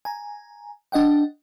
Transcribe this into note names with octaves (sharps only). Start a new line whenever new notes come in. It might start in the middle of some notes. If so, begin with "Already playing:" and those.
G#5 A#5
D4 D#5 F#5 G5